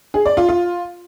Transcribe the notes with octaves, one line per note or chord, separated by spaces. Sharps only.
G#4
D5
F4
F4